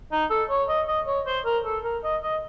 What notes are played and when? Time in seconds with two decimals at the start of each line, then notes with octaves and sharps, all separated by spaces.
0.12 D#4
0.30 A4
0.50 C#5
0.69 D#5
0.88 D#5
1.07 C#5
1.26 C5
1.45 A#4
1.65 A4
1.84 A#4
2.04 D#5
2.23 D#5